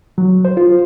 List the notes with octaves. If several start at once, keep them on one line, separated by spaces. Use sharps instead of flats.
F#3
C5
F4